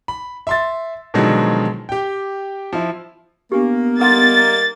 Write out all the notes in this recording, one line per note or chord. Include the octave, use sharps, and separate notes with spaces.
B5
E5 C6 A6
B2 D3 D#3 F3 F#3 G#3
G4 G5
F3 E4
A#3 B3 D4 G4
G3 A#3 D#4 A4 F#5 C6 A6